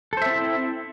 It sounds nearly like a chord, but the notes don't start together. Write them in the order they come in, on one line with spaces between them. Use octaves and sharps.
A4 C5 E5 C4 E4